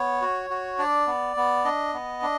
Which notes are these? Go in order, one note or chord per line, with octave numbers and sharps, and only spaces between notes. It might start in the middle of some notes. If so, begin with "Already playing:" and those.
Already playing: B3 C#5
F#4
F#4
D4 D5
B3
B3
D4 D#5
B3
D4